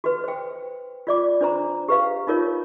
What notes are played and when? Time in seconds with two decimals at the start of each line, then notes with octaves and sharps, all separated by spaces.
0.04 F#4 B4
0.24 C5 G5
1.07 F4 D5 D6
1.41 D4 C5 A#5
1.88 G4 B4 F5
2.27 D#4 F4 A#4 C#5